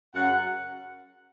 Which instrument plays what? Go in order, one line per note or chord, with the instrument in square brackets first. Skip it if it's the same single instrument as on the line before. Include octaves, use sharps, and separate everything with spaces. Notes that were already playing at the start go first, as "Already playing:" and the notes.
[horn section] F#2 C#3 F#3 F#5